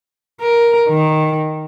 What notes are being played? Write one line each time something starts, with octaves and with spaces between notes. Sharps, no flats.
A#4
D#3